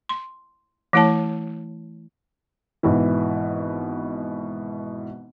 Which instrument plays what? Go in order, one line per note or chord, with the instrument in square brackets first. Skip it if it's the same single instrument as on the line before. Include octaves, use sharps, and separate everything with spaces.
[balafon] C6
E3 A3 E4 C#5 A5
[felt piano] G#1 B2 E3